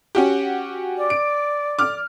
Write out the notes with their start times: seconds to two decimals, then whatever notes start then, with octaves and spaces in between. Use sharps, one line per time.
0.15 C#4 F#4 G4
0.97 D5
1.10 D7
1.79 D6 F6